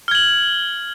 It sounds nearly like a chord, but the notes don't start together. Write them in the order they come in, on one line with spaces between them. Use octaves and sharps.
F6 G#6 F#7